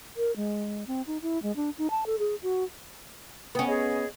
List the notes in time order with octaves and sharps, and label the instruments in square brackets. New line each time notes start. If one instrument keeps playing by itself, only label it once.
[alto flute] A#4
G#3
C4
D#4
E4
G#3
D4
D#4
A5
A4
G#4
F#4
[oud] B3 C#4 [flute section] G5 D#6
[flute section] G#4 C#5 D#5